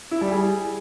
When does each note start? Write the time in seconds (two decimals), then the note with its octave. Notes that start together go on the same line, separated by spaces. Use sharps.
0.11 E4
0.21 G3
0.31 G#4